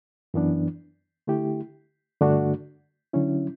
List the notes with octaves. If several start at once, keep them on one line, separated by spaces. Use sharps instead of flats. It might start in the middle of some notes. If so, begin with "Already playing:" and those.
F#2 E3 B3 D4
D3 A3 E4 G4
G2 D3 A3 D4 F#4
D3 F#3 C#4 E4